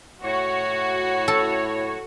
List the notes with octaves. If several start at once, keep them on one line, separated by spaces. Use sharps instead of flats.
A2 E4 F#4 C#5
A4